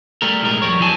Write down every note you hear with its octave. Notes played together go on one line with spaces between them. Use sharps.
G3 A3 A#4
B1 A2 G#3 A#4
F2 G3 A#4 C#5
E2 E3 F#3 F#4 G#5 A5